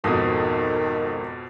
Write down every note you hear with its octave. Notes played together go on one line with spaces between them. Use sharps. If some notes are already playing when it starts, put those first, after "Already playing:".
G#1 F2 B2 D#3 A4 D#6